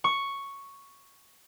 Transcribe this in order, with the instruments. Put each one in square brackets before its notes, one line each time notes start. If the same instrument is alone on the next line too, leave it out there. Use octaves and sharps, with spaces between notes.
[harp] C#6